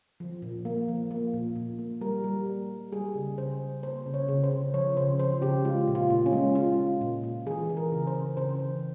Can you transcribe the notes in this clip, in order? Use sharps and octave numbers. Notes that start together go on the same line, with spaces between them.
F3
A#2
A#3
F3
A#3
A#2
A#2
A#3
G3 A#4
G3
A#3
G3
G3 G#4
C#3
C#3 C5
G3
A#3 C5
C#3
C#5
C#3
C5
C#3
F3 C#5
C#3 C5
F3 C5
C#3 G4
G#3 F4
A#2
F4
A#2
C#4
G#3
G#3 F4
G#3
A#2
A#2
E3 G#4
E3
A#4
C#3
C5
C#3
C#3 C5
E3